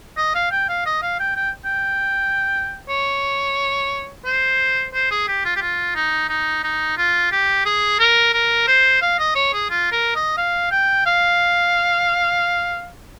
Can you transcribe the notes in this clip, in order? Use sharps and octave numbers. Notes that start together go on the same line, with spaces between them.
D#5
F5
G5
F5
D#5
F5
G5
G5
G5
C#5
C5
C5
G#4
G4
F4
G4
F4
D#4
D#4
D#4
F4
G4
G#4
A#4
A#4
C5
F5
D#5
C#5
G#4
F4
A#4
D#5
F5
G5
F5